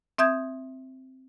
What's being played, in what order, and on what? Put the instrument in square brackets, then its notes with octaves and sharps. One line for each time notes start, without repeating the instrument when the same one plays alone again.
[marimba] C4 E5 D#6 G6 G#6